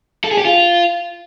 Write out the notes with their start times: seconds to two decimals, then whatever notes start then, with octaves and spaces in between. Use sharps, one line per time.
0.24 A4
0.31 G#4
0.38 G4
0.45 F4